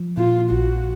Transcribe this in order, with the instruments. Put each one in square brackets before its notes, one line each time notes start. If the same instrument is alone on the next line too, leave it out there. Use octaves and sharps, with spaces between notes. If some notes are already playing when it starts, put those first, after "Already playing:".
Already playing: [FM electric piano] F3
[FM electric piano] A#2 [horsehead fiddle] F4
[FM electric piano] A#1 [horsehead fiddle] F#4